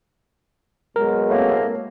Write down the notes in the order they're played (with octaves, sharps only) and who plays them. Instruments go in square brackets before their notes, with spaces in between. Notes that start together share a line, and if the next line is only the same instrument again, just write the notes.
[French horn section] B2 F#3 G#3 [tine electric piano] A#4
[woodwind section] A2 A#3 C4